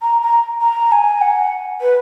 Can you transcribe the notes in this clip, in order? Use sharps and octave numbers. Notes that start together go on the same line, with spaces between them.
A#5
A#5
A#5
G#5
F#5
B4